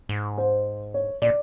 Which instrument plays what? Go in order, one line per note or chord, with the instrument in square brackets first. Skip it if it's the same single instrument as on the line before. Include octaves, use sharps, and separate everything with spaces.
[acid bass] G#2
[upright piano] C5
C#5
[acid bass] A#2 [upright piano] D5